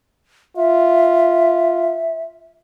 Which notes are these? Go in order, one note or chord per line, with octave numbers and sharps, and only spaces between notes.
F4 E5